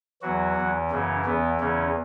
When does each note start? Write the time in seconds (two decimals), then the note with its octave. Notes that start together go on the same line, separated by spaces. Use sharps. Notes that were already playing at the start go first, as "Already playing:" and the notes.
0.22 E2 E3 F#3 F#4
0.57 E2 E3
0.91 F#2 C#3 E3 C#4
1.25 E2 E3 B3
1.60 E2 C#3 E3 C#4